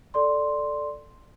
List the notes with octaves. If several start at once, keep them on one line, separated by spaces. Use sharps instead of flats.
A4 D5 C6